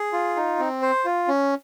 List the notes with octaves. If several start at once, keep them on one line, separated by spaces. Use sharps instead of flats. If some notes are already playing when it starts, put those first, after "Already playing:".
Already playing: G#4
F4
D#4
C4
C5
F4
C#4